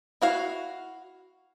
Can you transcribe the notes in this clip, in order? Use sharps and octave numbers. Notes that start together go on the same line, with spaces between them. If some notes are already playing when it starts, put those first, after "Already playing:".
E4 F#4 F5